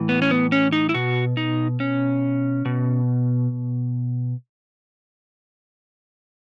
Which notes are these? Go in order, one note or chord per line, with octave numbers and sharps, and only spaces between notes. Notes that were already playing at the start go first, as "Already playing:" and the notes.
Already playing: A2 E3
B3
C#4
B3
C#4
D#4
E4
B2 F#4
D#4
C#4
B2